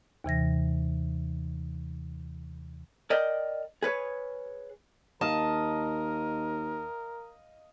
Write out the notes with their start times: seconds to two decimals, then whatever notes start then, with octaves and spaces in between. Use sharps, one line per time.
0.24 D#2 C3 E3 A#6
3.10 A#4 D5 D#5 G5
3.82 G#4 B4 C#5
5.21 D#2 A#4 D#5 F5 A5